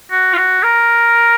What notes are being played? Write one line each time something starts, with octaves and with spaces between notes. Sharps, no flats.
F#4
F4
F#4
A#4